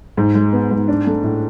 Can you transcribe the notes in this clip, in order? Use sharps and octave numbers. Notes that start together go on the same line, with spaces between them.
G#2
G#3
B3
G#2
D4
A3
A2